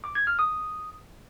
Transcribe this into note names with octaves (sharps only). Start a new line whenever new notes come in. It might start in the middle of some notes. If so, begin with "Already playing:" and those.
D6
G#6
F6
D#6